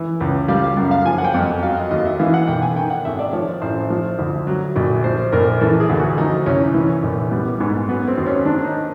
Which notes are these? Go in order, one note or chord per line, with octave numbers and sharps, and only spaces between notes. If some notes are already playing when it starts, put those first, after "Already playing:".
Already playing: E3 E5
C#2
G3 F5
F5
F#2
F5
F3 G#5
F#5
G5
F2
F#3 F5
D#5
D#2 D#5
E5
E3 F5
F#5
B1 G5
G#5
D#3 G5
F#5
G#1 E5
D5
F3 C#5
A1 C5
F3
D2
F#3
A#1
F3 C5
A#1 A#4
E3 A4
G#4
D2
F#4
F3 D#4
C2 C#4
E3
A#1
G3 B3
G#2 B3
F#3 B3
C4
D#2
C#4
D#3 D4
D#4